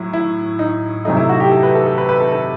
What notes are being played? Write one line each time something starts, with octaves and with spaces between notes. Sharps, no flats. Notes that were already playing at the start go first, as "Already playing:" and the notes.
Already playing: A2 F#3 E4
E4
D#4
C3 F#3 A3 D#4
E4
F#4
G4
A4
B4
A4
A4
B4
B4
A4
A4